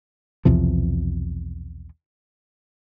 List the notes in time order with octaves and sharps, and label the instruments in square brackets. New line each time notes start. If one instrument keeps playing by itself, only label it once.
[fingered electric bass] B1 E2 C3 F3